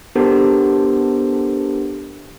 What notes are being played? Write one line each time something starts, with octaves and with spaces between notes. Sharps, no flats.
B3 D4 G4 A4 A#4 C5